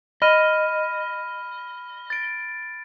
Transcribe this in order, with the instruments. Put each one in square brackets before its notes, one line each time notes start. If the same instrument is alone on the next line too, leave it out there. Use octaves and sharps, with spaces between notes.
[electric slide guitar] D#5 [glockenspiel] B5 F6 D#7
[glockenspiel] A6 D7